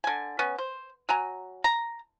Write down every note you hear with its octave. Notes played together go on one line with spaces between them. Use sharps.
D3 G#5
B3 C#4
C5
F#3 G#5 A#5
A#5